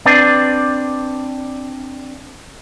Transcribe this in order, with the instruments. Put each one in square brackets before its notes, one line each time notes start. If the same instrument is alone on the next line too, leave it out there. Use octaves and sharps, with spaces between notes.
[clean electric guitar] C4 D4 B4 D5